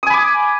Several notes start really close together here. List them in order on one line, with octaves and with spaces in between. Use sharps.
D#6 G#5 B5 D6